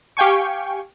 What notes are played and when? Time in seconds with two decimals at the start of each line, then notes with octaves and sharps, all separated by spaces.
0.17 G4 F5 G5 G#5 C#6